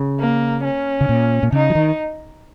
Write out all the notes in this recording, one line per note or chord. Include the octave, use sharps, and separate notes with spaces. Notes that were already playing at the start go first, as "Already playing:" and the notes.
Already playing: C#3
A#3
C#4
C#3
A#2
A#2
C#3 D#4
F3
D#3